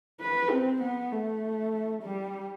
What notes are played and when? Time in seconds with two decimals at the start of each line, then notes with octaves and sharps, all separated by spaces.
0.21 B4
0.50 C4
0.82 B3
1.12 A3
2.03 G3